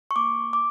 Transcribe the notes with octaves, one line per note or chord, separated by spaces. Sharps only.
C#6
A#3 D6
D6